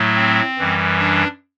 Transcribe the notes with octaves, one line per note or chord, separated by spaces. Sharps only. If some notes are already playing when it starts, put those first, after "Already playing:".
Already playing: A2 F#3 A3
C4
F#2 E3 G3
D4